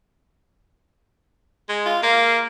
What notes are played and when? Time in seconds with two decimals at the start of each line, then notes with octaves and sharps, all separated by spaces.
1.69 G#3
1.86 F4
2.03 A#3 F5